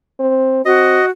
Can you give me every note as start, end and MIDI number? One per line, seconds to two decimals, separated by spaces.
0.20 0.64 60
0.65 0.99 60
0.65 1.10 66
0.65 1.05 75